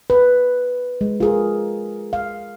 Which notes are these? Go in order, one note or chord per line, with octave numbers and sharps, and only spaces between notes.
B4
G#3
F4 G#4 A#4
F5